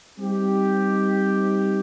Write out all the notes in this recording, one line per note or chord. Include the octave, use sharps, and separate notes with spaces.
G3 C4 D#4 G4